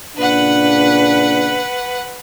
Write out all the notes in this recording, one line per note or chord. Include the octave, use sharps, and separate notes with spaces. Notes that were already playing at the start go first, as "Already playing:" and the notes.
A#2 C#3 D4 B4 F#5